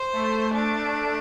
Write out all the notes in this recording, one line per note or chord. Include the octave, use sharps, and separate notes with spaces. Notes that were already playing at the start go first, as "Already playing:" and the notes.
Already playing: C5
A3
D4